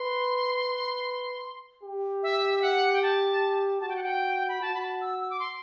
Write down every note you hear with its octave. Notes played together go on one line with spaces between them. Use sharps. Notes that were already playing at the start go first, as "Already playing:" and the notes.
Already playing: B4 C6
G4
E5
E5
F#5
G5
A5
F#4 A5
G5
F#5
G5
B5
F#4 A5
B5
A5
E6
E6
D6
C6